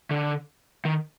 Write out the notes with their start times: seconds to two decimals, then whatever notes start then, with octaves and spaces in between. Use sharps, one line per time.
0.11 D3
0.85 D#3